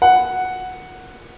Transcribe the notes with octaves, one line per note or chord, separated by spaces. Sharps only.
F#5